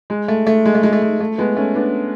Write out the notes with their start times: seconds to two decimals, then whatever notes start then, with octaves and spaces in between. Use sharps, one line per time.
0.10 G#3
0.28 A3
0.47 A3
0.66 G#3
0.75 A3
0.83 G#3
0.93 A3
1.02 G#3
1.20 A3
1.38 G#3 B3
1.57 A3 C#4
1.75 B3 D4